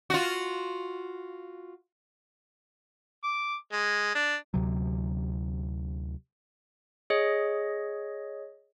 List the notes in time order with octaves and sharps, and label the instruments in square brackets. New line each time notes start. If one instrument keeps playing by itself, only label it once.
[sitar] F4 F#4
[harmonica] D6
G#3
D4
[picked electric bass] D2 C3 F#3
[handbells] G#4 C#5 D#5